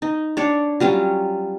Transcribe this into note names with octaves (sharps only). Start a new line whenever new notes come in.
D#4
D4 C#5 D5
F#3 G3 C#4 F4